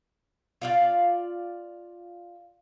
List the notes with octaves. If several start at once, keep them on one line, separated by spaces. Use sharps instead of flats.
F4 D5 F5